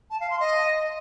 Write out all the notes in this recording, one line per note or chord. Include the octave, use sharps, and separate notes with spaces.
A5
F5
C6
D#5